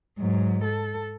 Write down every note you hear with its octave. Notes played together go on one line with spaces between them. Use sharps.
G#2 F#3
A4